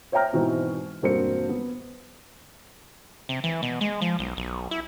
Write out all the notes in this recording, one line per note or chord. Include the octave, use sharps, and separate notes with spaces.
C5 C#5 E5 G5 A#5 F6
G#2 B2 E3 C4
E1 G2 A#3 C4 F#4 C#7
B3
C3
E3
B2
G#3
F3
B1
B1
E4